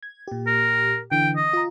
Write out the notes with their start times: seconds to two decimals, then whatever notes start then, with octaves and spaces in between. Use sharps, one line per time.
0.03 G#6
0.28 A#2 G4
0.47 A#4
1.12 D3 E3 G5
1.37 D#5
1.53 F4 A#5